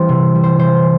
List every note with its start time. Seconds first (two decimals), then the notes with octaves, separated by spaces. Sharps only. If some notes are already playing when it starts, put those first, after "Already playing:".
Already playing: E3 G3 C4 C5
0.09 C3
0.35 G3
0.43 C5
0.59 E3 C5